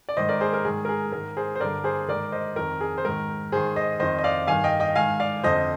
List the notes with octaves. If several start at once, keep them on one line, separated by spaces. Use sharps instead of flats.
D5
G#2 D#3 C5 D#5
A#4 D5
G#4 C5
A#4
G#2 D#3 G#4
A#4
G#4
G#2 D#3 A#4
G#4 C5
C5
G2 D3 A#4 D5
G#4 C5
G#2 D#3 A#4 D5
C5 D#5
F2 D#3 A#4
G#4
C5
G#2 D#3 A#4
G#2 D#3 G#4 C5
C5 D#5
F2 D#3 C5 D#5
D#5
D5 F5
G2 D#3 F5 G#5
D#5 G5
D#5 G5
G#2 D#3 F5 G#5
D5 F5
F2 D3 C5 D#5